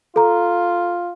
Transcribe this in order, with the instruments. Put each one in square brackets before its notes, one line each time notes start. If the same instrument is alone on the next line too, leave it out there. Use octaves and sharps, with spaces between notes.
[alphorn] F4 [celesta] A4 A#5